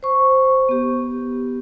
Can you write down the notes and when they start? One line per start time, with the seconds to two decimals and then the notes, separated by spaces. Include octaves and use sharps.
0.03 C5 C#6
0.69 B3 G4